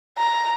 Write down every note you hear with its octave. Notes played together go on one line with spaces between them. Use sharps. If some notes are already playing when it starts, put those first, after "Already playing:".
A#5